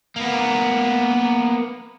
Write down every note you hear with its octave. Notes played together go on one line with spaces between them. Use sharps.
A#3 B3